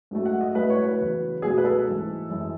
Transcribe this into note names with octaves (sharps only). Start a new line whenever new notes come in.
G#2 F#3 A3
F#5
D#5
A2 F#3 A3 B4
C#5
B4
E2 C#3 F#3
C#2 B2 F#3 A3 G#4
B4
A4
G#2 E3 A3
F#2 E3 G#3